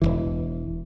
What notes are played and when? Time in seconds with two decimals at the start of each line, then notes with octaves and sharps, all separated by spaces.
0.02 E1 C#2 E3